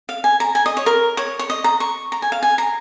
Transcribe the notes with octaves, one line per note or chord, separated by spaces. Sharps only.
F5
G#5
A#5
G#5
D#5
C#5
A#4
C#5
C#5
D#5
A#5
C#6
A#5
G#5
F5
G#5
A#5